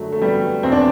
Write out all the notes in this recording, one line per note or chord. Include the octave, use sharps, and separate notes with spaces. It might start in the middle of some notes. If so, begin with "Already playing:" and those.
Already playing: F#2 D3 F#3 A3
A3
G3 B3
E2 B2 C4
D4